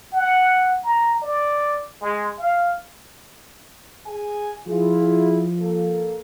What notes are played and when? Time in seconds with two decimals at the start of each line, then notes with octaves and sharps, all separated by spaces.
0.13 F#5
0.84 A#5
1.22 D5
2.01 G#3
2.38 F5
4.06 G#4 G#5
4.67 F3 E4 F4 G#4
5.60 A#3 A4